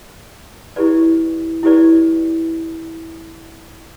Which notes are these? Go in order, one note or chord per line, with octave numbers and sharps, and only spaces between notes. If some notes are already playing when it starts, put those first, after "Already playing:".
E4 G4 B4 D5
E4 G4 B4 D5